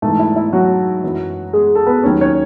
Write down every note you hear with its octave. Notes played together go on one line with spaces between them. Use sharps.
G#2 E3 A3 A4
E4
E4
F#3 F#4
F#2 E3
G#3 G#4
A4
B3 B4
D#2 D#3 F#3 C#4 C#5
C#4 C#5